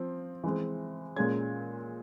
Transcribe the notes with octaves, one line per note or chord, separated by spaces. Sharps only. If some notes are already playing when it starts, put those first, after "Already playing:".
Already playing: F3 C4
E3 G#3 C4
A#2 G#3 C#4 G#6